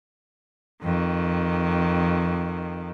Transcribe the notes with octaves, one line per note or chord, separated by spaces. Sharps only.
F2 D#3